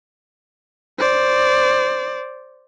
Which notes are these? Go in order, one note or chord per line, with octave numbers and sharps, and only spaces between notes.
C5 D5